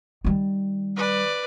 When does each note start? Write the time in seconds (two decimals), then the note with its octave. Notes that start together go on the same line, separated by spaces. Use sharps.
0.24 D#3 G3
0.96 B4 D5